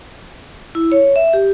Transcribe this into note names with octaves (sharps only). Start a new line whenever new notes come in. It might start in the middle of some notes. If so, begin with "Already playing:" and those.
E4
C#5
E5
G4